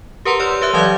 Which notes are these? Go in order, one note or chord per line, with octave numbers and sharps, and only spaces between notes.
G4 A#4 B4 F#5 A#5 C6
G4 C#5 D5 C6 E6 F6
G4 B4 E5 F#6
E3 F#3 D5 F5 D#6 G#6